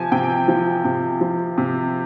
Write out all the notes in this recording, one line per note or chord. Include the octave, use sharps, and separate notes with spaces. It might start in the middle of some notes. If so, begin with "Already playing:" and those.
Already playing: C3 F3 G#5 A5
C3 G5
F3
C3
F3
C3